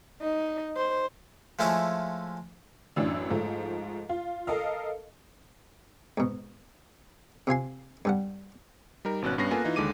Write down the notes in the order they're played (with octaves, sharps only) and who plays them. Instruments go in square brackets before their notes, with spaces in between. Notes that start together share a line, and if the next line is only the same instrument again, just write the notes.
[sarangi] D#4
C5
[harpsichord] F3 G#3 A3 C#4 E4 F4
[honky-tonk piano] A1 F#2 E3 D4
G#2 F3 A3
F4
A4 A#4 D#5 F5
[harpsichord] G#2 B2
C3 F4 G#5 C6
G2 G3 F#5
[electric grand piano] G3 D#4 A#4
G#1 B2 C#4 F#6
G2 B3 C#4 A#6 C7
A#3 B3 F4 A4 G#5
E3 D#4 F4
D#2 D3 G#3 D6 D#7